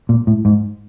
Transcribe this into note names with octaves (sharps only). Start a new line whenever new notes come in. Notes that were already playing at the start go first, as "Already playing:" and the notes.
A#2
A2
G#2